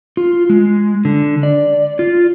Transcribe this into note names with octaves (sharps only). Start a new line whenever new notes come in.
F4
G#3
D3
D5
F4